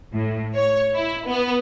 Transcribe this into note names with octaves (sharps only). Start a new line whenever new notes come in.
A2
C#5
E4
B3